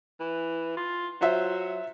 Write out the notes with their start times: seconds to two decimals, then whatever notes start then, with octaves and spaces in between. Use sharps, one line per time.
0.20 E3
0.77 F4
1.21 F#3 F4 C5 E5